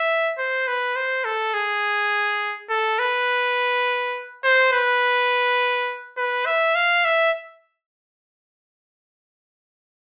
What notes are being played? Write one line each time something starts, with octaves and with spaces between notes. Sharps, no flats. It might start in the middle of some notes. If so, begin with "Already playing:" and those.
Already playing: E5
C5
B4
C5
A4
G#4
A4
B4
C5
B4
B4
E5
F5
E5